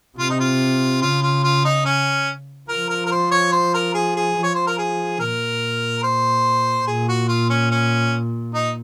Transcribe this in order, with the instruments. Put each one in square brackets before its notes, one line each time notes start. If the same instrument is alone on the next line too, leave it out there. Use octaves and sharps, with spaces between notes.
[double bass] C3 [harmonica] F4
[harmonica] D#4
F4
[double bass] C#3 [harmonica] F4
[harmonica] F4
F4
D#4
C#4
[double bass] F3 [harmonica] A#4
[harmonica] A#4
A#4
C5
C#5
C5
A#4
G#4
G#4
[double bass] F3
[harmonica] C#5
C5
A#4
G#4
[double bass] A#2 [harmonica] A#4
[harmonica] C5
[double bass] A#2 [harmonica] G#4
[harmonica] F#4
F4
C#4
C#4
D#4